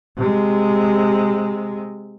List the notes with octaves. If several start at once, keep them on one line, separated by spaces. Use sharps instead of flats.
C3 G#3